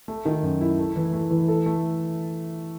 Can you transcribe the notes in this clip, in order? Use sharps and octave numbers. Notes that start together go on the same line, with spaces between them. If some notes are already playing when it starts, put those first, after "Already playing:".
A3
D#3
F#2
E4
A3
E3
A3
E3
A4
A3